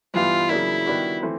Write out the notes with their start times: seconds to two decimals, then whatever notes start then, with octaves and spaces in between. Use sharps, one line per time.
0.14 G2 E3 G3 B3 F4
0.50 C#3 F#3 A#3 D4 E4
0.86 D#3 G3 B3 D4 F#4
1.23 E3 A3 C4